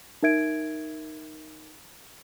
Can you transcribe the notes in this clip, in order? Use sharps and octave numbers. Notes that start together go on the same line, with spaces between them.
D#4 A#4 E5 G#6 D7